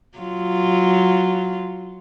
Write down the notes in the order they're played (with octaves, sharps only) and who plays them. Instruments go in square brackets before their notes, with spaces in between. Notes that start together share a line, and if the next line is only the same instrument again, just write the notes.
[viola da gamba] F#3 F4